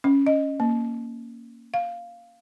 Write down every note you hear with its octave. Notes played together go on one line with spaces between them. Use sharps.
C#4
D#5
A#3
F5